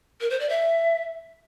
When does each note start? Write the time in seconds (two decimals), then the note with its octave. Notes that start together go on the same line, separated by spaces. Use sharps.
0.21 A#4
0.30 C5
0.40 D5
0.49 E5